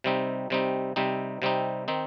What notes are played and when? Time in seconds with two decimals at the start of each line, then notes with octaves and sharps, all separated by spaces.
0.04 C3 G3 C4 D#4
0.50 C3 G3 C4 D#4
0.96 C3 G3 C4 D#4
1.42 C3 G3 C4 D#4
1.88 D#3 C4 D#4